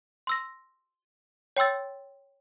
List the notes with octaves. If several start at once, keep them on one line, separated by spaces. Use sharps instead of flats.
C6 E6 A#6
C#5 G5 C6 E6 A6